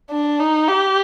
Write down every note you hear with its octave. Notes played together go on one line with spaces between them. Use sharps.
D4
D#4
G4